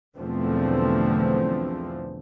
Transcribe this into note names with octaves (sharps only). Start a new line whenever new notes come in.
B1 E2 D3 F3 A3 C4